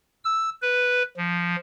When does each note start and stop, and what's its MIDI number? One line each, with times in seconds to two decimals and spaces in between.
0.25 0.50 88
0.62 1.03 71
1.17 1.56 53